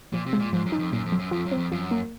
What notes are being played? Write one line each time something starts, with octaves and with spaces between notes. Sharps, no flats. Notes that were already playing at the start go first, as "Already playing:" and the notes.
A#2 F3
C3
G#3
A#2
G#2 F3
F#2
D#4
F2
F#2 A#2
F2
F#3
F#2
F2 F4
F#2
C4
F2
F#2 F3
A#3